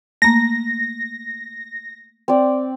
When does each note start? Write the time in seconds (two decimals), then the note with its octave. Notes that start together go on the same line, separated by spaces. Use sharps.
0.22 A3 A#3 A#6
2.28 C4 D5